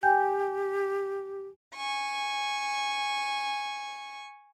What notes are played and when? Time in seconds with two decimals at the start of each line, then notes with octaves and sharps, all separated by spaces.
0.03 G4 G5 G#5 G6
1.75 G#5 C#6